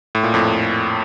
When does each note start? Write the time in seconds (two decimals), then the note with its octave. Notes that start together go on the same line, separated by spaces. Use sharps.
0.15 A2
0.23 A#2
0.34 F2 A2